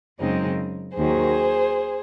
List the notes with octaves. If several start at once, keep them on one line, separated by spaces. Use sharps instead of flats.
F#2 C#3 G#3 C4 D#4
D#2 D#3 F#3 G#4 C5